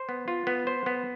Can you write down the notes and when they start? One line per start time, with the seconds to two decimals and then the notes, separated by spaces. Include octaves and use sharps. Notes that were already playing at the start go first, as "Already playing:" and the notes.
Already playing: C5
0.09 B3
0.28 F4
0.47 B3
0.67 C5
0.86 B3